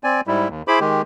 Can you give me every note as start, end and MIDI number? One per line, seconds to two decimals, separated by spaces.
0.04 0.21 60
0.04 0.21 74
0.04 0.21 80
0.27 0.48 44
0.27 0.48 55
0.27 0.48 64
0.49 0.62 39
0.68 0.79 64
0.68 0.79 68
0.68 0.79 72
0.68 0.79 83
0.68 0.79 86
0.80 1.02 51
0.80 1.02 56
0.80 1.02 67